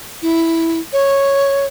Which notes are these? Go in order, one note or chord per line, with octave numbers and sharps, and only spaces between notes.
E4
C#5